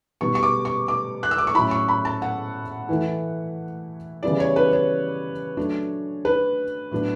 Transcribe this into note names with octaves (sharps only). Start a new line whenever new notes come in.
B2 G3 B3 C#6
C#6
D6
C#6
D6
F#6
E6
D6
C#6
A2 F#3 C#4 E4 B5
C#6
B5
A5
F#5
E3 A3 E4
C#3 E3 G3 B3 E4 D5
C#5
B4
C#5
F#3 A3 D4
B4
A2 F#3 B3 D4